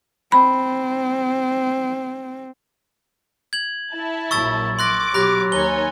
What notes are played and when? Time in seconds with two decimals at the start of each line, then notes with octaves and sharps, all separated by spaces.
0.32 C4 B5
3.53 G#6 F#7
3.93 E4 A5
4.31 A#1 A#2 F#3 C#6 E6 A6
4.79 C6 D6 F#6 A#6
5.14 B2 F#3 G4 B5 F#6 A#6
5.52 D#2 C#5 G#5 A#5 G7